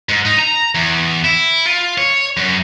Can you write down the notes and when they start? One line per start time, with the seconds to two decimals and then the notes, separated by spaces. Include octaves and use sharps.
0.09 G#2
0.25 D#4
0.39 A#5
0.75 E2
1.24 E4
1.66 F4
1.98 C#5
2.37 F#2